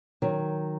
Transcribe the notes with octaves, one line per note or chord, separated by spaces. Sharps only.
D#3 F#3